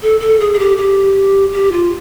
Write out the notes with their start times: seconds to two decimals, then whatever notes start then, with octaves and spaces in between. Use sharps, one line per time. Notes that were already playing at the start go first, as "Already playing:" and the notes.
0.02 A4
0.20 A4
0.40 G#4
0.54 G#4
0.59 G4
0.77 G4
1.53 G4
1.72 F4